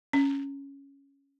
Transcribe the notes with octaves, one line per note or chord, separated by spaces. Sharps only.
C#4